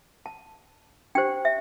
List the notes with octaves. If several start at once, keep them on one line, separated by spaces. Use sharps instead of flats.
A5
D4 G4 C5 G5
E5